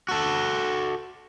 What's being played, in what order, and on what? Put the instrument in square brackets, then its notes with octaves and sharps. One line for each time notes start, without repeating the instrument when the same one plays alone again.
[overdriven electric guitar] F#4 A4